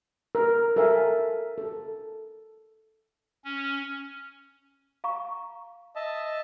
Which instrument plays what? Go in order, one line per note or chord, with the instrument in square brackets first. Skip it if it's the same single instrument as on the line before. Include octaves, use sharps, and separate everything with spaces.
[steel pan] A#4
A4 A#4 C5 E5 F5 G#5
A4
[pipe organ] C#4
[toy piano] F5 A#5 C#6
[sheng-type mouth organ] D#5 E5 A5